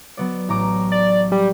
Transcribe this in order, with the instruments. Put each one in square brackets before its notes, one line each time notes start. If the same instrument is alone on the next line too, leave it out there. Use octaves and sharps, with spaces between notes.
[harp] F#3 B3 D5
A1 A#5 D6
[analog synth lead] D5
G3